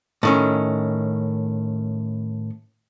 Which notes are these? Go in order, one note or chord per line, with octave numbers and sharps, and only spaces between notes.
A2 D#3 C#4